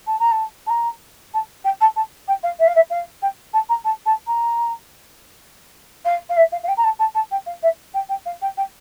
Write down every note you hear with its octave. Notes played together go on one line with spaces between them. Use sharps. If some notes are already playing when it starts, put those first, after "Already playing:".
A5
A#5
A5
A5
A#5
A5
G5
A5
A5
G5
F5
E5
F5
E5
F5
G5
A5
A#5
A5
A5
A#5
F5
F5
E5
F5
F5
G5
A#5
A5
A5
A5
G5
F5
E5
G5
G5
F5
G5
G5